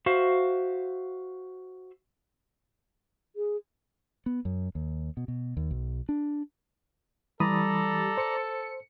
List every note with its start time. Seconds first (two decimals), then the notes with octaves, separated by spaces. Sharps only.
0.06 F#4 C5 E5 F5
3.36 G#4
4.26 B3
4.45 F#2
4.75 D#2
5.17 B2
5.28 B2
5.57 D#2
5.71 B1
6.09 D4
7.40 E3 G3 A4 D5 A#5 B5 D#6
8.17 C5 C#7